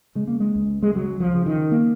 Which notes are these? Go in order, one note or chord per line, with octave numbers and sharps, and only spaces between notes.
C#3 G#3
A#3
G#3
C#2
G#3
C#3 F#3
F3
C#3
D#3
A#3